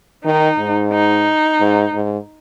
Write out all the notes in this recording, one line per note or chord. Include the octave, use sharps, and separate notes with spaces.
D#3 D#4
G#2
D#4
G#2
G#2